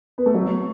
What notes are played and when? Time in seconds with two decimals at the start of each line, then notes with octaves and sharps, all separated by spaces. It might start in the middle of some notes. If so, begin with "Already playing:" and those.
0.18 B3
0.26 A3
0.34 F#3